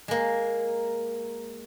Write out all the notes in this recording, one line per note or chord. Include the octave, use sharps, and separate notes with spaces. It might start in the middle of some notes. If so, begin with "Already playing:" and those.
G#3 A#3